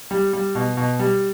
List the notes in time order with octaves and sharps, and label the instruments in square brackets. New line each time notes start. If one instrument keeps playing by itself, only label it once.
[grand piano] G3
G3
B2
B2
G3